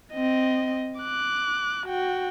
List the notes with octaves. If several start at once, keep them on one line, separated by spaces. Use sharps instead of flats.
C4 D#5
D6 F#6
F#4 G5